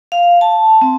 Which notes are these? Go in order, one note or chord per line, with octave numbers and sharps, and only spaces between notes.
F5
A5
C4